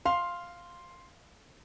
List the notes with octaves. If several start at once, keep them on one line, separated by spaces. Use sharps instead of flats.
F5 C6